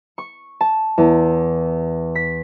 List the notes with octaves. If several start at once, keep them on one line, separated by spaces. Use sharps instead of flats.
C#6
A5
E2
B6